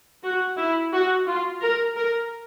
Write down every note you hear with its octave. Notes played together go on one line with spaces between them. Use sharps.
F#4
E4
F#4
F4
A#4
A#4